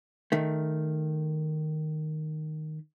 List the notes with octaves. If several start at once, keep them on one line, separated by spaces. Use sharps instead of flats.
D#3 A3